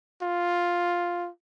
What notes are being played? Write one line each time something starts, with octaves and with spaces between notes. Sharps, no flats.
F4